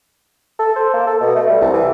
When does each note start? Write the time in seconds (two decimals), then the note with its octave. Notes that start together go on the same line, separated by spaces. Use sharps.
0.59 A4
0.76 C5
0.94 A#3
1.07 A4
1.21 B2
1.36 A3
1.50 G3
1.61 C2
1.74 E3